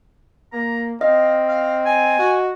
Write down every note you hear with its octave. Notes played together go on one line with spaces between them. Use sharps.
A#3 A#5
C4 D#5 F5
F5
G#5
F#4